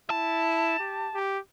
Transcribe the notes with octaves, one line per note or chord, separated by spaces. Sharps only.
E4 A5
G4
G4